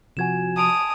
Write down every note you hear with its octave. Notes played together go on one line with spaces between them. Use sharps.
C3 F3 F#4 G#5 G#6 E7
A5 D#6 D7 F7